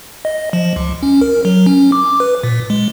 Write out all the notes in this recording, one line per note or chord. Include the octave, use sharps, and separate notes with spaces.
D#5
F3
C#2
C#4
A#4
F#3
C#4
D6
B4
A#2
G#3